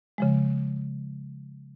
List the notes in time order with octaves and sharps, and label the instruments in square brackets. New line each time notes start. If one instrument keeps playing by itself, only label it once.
[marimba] C#3 F3 G#3